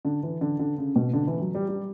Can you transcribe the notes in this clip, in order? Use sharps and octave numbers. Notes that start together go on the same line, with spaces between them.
D3
E3
D3
D3
C#3
B2
D3
E3
F#3
G3
G3